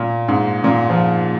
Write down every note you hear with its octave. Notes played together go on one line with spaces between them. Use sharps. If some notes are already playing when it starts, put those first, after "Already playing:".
Already playing: A#2
G#2
A#2
F3